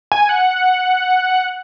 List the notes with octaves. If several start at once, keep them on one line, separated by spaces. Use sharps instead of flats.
G#5
F#5